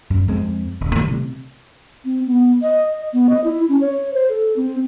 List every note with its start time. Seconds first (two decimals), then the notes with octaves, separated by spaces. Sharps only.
0.10 F#2
0.28 F2 G#3 C4
0.81 D#1
0.95 A2 D#3 E3 G3
1.09 C3
2.05 C4
2.26 B3
2.62 D#5
3.14 B3
3.29 D#5
3.44 E4
3.69 C#4
3.81 C#5
4.14 C5
4.29 A4
4.56 C4